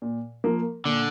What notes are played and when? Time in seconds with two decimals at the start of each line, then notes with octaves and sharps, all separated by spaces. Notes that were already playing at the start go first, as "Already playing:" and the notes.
0.02 A#2
0.44 F3 A#3
0.85 A#2 D3